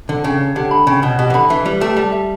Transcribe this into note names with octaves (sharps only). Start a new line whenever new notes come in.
D3 A4
C#3 G5
C#5
D3 G4
B5
C#3 G5
B2 C#5
B2 G4
E3
D3 B5
E3 E5
G3 B4
A3 G4
G3 A5
E5